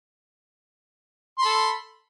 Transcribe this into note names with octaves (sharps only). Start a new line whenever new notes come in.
A4 B5 C6